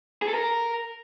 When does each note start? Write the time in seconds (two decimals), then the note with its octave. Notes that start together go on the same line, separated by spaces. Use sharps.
0.22 G#4
0.28 A4
0.34 A#4